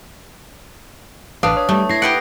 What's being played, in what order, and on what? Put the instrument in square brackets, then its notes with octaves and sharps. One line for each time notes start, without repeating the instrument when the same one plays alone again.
[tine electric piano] A1 D#6 [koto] D4 [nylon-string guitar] B4 F5
[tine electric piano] C#5 [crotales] D#6
[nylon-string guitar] G3 [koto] A3
[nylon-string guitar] E4 [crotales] G#6 A#6 C7
[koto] G4 B4 F#5 [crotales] D7